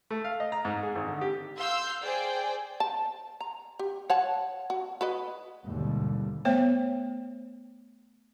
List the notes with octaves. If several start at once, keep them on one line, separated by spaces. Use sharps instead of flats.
A3
F5
D#5
A#5
G#2
G#4
G#1
D3
G4
F5 C6 E6 G6
G#4 C5 D5 G5
A5
A#5
G4
C#5 F#5 A5
F#4
F#4 B4 D#5
G#1 D#2 B2 D3 G3
A3 B3 C5 C#5 G5